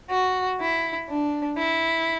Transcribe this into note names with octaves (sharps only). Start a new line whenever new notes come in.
F#4
E4
D4
E4